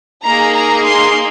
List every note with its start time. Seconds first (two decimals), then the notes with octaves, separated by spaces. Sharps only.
0.25 A#3 D#4 G#4 A#5
0.56 A#5
0.86 C6